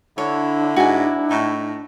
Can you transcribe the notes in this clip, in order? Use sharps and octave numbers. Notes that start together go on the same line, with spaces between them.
D3 D4 E4 C#5
G#2 F#4 G#5
A2 D#4 C#6